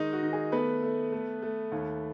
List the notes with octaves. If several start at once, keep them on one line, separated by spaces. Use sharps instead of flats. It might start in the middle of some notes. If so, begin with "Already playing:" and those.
Already playing: D#3 G#3 D#4 D#5
F#4
D#3
G#4
A3 B3 B4
A3
A3
A3
D#2